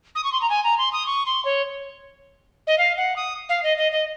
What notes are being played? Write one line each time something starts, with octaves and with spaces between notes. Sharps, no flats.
D#6
C#6
C6
A#5
G#5
A#5
C6
D#6
C#6
C6
C#5
D#5
F5
F#5
D#6
F5
D#5
D#5
D#5